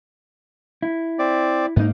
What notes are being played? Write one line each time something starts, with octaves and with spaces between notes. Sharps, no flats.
E4
C4 D5
G#2 A#3 B3 D#4